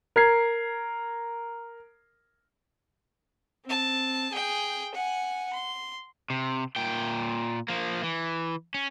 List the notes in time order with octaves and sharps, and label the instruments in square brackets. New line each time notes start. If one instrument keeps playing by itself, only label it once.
[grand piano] A#4 G#6 C7
[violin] C4 A5
G#4 G5
F#5 G#5
C6
[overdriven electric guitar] C3
A#2 G5
F3 A#3
E3
C#4